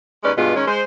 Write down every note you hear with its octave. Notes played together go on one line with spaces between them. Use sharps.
D#2 G#3 C#4 B4 D5
G2 B2 G#3 B3 F4
D#3 G#3 C#4
G#3 C5